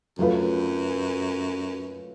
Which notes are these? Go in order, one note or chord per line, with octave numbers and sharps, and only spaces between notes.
F#2 F#3 A3 F4 B4